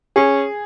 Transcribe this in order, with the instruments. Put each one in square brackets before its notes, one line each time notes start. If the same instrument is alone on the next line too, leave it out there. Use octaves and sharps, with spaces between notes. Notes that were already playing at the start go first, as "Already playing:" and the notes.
[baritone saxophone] C#4 [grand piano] G#4